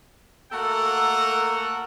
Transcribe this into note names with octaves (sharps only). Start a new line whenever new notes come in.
A3 A#3 F#4 A4 A#4 F#5